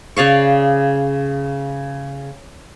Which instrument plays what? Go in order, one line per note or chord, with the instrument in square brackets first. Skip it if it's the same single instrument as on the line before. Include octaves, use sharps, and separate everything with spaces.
[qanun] C#3 D5 F5 C#6